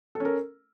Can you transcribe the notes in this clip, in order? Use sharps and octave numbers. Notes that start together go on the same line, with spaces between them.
C#4 A4 A#4